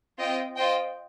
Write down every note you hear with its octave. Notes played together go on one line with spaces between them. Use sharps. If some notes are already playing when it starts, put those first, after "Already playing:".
C4 F4 D#5 G5
F4 C5 D#5 G5